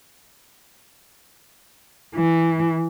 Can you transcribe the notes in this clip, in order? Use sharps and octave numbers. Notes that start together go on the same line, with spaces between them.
E3